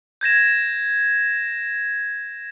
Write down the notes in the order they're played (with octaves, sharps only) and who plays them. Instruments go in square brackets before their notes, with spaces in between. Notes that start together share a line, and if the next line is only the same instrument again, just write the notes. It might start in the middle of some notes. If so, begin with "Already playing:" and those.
[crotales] G6 G#6 A#6 E7